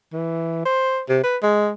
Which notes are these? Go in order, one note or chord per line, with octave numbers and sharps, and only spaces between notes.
E3
C5
C3
B4
G#3